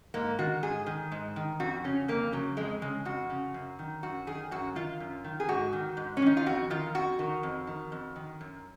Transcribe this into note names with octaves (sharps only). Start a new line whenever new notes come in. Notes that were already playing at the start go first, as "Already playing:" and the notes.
G#2 A#3
D#3 F#4
G#2 G#4
D#3
G#2
D#3
F2 F#4
C#3 C#4
F2 A#3
C#3 F#3
F2 G#3
C#3 G#3
F2 F#4
C#3
F#2
D#3
F#2 F#4
D#3 G#4
F#2 F#4
D#3 F4
F#2
D#3
G#4
G#2 F#4
D#3
G#2
C#4
D#3 D#4
F4
F2 F#4
D#3 F4
F2 F#4
D#3
F2
D#3
F2
D#3
F#2